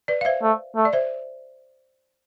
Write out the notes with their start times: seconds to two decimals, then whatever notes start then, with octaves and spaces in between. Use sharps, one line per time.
0.08 B4 D5
0.21 F5
0.25 C5 E5
0.42 A3
0.76 A3
0.85 D5
0.93 C5 E5